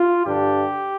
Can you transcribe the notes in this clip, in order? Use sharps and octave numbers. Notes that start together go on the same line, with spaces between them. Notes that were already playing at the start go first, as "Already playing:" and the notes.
Already playing: F4
G2 D3 G3 D4 G4